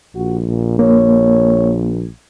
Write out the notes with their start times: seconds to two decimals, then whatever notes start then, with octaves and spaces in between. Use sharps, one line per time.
0.16 A#1 F#4
0.48 A#2
0.79 A#3 C#5